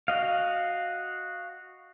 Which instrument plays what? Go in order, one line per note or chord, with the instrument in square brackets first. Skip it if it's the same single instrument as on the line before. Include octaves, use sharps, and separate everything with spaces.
[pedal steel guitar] F#4 D#5 F5